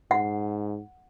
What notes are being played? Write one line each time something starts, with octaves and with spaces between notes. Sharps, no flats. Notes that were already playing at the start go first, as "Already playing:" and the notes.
G#2 F#5